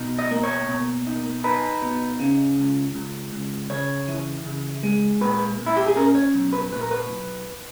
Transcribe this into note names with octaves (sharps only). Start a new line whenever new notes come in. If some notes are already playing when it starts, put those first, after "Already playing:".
Already playing: B2 D#4
D#5
A#3
C#5
B2
D#4
D#4 B4
B2
C#3
C#2
C#2
C#2
C#3 C#5
E3
C#3
G#3
A#2 B4
A#2
E4
G4
G#4
C#4 A#4
C#5
B1
B4
A#2 B4
A#4
B4
B1